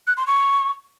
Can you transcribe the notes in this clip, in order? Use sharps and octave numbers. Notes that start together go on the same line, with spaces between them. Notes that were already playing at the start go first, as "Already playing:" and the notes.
F#6
C6
C#6